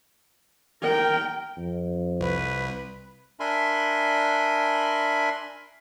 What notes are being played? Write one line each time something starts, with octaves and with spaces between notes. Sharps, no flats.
A#4 G5
F2
C2 B4
D4 A#4 E5 G#5 B5 C6